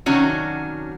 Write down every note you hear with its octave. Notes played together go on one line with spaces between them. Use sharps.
C3 D#3 F#3 C#4 D4 F#4